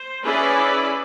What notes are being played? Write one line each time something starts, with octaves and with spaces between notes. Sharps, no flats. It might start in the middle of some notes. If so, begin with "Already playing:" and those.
Already playing: C5
C#4 E4 G#4 B4 D5